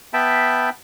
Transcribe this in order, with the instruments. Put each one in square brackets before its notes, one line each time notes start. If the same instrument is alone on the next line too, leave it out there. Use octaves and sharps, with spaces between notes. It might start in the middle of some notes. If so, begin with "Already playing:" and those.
[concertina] B3 E5 G5 A5 B5